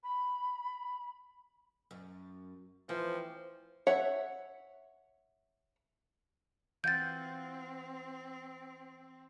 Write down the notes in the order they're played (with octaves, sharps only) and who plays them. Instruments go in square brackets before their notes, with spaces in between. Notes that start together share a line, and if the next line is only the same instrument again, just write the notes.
[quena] B5
[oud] F#2
[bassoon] E3 [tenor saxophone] F3 [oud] C4
[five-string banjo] C#5 E5 F#5
[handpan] E3 F5 F#5 [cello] C4 [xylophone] G6 A6